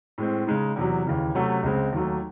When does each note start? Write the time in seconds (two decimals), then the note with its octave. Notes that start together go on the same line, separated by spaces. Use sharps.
0.18 A2 G#3 C4
0.47 C#3 G#3 D#4
0.76 E2 C3 F#3
1.05 D#2 C#3 E3
1.35 C3 F#3 A3 C#4 F#4
1.63 C#2 C#3 G#3 C4
1.93 D#2 D#3 F#3 A3